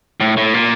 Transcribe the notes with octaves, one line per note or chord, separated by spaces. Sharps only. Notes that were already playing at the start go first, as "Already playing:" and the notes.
A2
A2
A#2